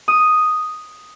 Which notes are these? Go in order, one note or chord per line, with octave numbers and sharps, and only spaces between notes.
D#6